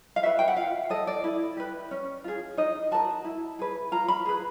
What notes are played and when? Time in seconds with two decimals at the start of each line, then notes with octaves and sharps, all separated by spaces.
0.16 F5
0.23 F#4 B4 E5
0.39 G5
0.48 F#5
0.57 F4 F5
0.90 A4 D#5
1.07 D5
1.24 E4
1.57 G4 B4
1.91 C#4
2.24 F4 G#4
2.57 D#4 D#5
2.91 F#4 A#4 A5
3.25 E4
3.59 G#4 B4
3.92 F4 A#5
4.08 B5
4.26 G#4 B4